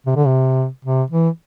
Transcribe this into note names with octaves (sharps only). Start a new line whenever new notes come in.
C3
D3
C3
C3
E3